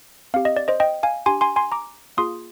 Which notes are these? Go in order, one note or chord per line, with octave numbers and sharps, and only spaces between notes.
C4 G4 F5
D#5
D5
C5 D#5
D#5 G5
F5 G#5
D4 G4 G#5 C6
G#5 C6
G#5 C6
A#5 D6
A#3 F4 G#4 C6 D#6